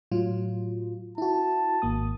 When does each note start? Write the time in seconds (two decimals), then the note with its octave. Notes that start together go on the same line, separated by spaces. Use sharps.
0.12 A2 F#3 F4
1.18 E4 F#4 A5
1.82 G#1 A#3 D#6